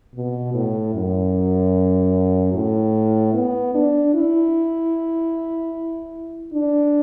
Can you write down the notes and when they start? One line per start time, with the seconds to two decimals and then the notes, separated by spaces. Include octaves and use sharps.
0.15 B2
0.54 A2
0.94 F#2
2.53 A2
3.34 B3
3.74 D4
4.14 E4
6.53 D4